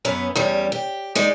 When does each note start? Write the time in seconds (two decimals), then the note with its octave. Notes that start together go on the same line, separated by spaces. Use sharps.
0.05 F#2 B3 C#4
0.36 E2 G3 C#4
0.72 G4
1.15 G#3 D#4 D5